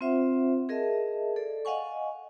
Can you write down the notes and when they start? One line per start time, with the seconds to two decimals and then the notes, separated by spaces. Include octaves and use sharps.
0.01 C4 F4 C5 E5 F#5
0.69 G#4 A#4 D#5 E5 A5
1.36 A4 D5
1.65 D#5 F5 F#5 G#5 C#6